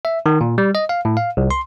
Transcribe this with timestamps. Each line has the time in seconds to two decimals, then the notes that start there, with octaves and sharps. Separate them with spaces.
0.05 E5
0.26 D#3
0.41 A#2
0.58 G3
0.75 D#5
0.89 F5
1.05 A2
1.17 F5
1.37 C2
1.51 C6